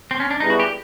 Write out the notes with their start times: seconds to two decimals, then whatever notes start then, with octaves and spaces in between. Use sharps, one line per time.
0.11 C4
0.20 C#4
0.31 D4
0.40 G3 B3 D#4 E4 G#4 B4
0.50 F#4
0.60 G4